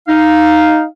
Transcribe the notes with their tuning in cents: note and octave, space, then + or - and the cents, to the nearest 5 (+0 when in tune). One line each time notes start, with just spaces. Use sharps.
D#4 +0 F5 +0